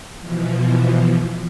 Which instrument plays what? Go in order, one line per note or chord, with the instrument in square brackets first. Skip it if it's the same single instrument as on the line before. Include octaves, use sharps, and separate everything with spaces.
[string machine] B2 E3 F3